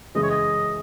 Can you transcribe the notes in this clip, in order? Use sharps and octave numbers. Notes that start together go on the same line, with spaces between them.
F#2 C#3 E3 G#3 D#5
C#5
D#5